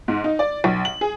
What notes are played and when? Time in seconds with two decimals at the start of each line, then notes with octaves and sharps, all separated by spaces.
0.08 G#2
0.24 D#4
0.39 D5
0.64 B1
0.85 F#7
1.01 G#4